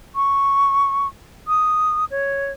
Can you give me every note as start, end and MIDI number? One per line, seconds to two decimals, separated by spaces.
0.15 1.08 85
1.48 2.05 87
2.11 2.52 73